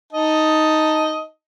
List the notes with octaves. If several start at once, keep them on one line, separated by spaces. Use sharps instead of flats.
D#4 D#5 A5